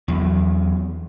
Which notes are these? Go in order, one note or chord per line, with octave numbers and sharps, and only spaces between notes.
E2 F#3